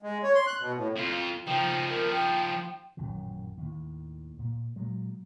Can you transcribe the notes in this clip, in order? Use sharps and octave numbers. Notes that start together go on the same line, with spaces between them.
G#3
C#5
C6
F#6
B2
A2
F2 F4
F3 D#4 G5
A#4
G5
A1 F#2 A#2 D#3
D#2 A2
A#2
A#2 F#3 G#3